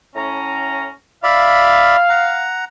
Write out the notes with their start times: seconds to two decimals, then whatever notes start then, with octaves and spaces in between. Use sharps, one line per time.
0.15 A2 C#4 A#5
1.23 D5 E5 F5 B5
2.09 F#5 A#5